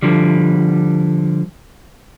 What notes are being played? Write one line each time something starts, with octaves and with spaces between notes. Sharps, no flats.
D3 F3 G3